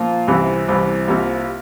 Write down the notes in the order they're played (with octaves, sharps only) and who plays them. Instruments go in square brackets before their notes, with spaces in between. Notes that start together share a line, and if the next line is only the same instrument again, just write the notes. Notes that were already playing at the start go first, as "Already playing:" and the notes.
Already playing: [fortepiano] A#2 F3 A#3 F4
C2 C3 E3
C2 C3 E3
C2 C3 G3 A#3 F4